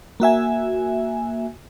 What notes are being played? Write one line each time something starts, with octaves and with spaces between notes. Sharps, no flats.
A#3 F#4 E5 G#5